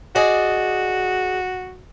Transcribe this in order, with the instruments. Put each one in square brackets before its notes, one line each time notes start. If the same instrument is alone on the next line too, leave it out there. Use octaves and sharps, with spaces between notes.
[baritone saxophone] F#4 [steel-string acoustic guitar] G#4 D5 D#5